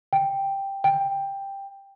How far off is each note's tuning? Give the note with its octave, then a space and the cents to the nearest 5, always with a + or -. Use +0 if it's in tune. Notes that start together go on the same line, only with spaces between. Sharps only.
G5 +5
G5 +10